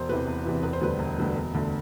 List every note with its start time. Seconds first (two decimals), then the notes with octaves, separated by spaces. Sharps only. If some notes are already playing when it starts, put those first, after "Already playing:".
Already playing: E1 C5
0.09 E2 C3 E3 B4
0.28 E1
0.45 E2 C3 E3
0.63 E1 B4
0.73 C5
0.81 D2 D3 G3 B4
0.99 E1
1.18 D2 D3 G3
1.35 E1
1.54 D2 D3 A3